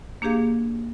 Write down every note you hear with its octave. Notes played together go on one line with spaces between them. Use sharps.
A#3 D4 G4 G#4 F5